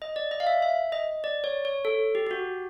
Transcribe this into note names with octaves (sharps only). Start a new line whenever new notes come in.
D#5
D5
D#5
F5
E5
E5
D#5
D5
C#5
C#5
A4
G4
G4
F#4